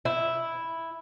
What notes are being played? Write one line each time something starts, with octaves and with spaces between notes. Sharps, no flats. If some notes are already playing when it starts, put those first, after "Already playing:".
E4